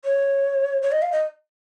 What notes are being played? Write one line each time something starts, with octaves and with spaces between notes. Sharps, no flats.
C#5
C#5
D#5
F5
D#5